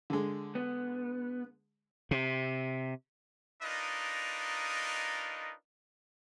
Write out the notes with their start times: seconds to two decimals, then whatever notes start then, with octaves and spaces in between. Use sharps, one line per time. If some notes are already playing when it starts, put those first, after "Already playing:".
0.10 D3 G#3
0.55 B3
2.11 C3
3.63 D4 D#4 F4 A#4 B4 D#5